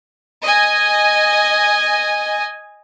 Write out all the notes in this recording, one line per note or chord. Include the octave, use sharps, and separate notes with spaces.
D#5 G#5